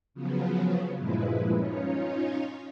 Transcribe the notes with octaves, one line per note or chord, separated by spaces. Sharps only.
C#3 F3 F#3 B3
G2 A#2 F3 G#3 E4 B4
C#4 D#4 F4 C#5